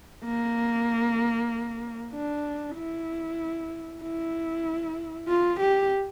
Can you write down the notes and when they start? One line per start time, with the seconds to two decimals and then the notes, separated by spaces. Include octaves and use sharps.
0.24 A#3
2.13 D4
2.76 E4
4.02 E4
5.28 F4
5.60 G4